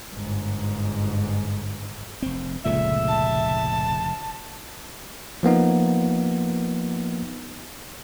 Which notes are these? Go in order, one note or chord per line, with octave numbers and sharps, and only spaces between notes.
G1 G#2
F1 C4
F1 C#2 A#2 C#3 A3 E5
A5
F3 A#3 B3 D#4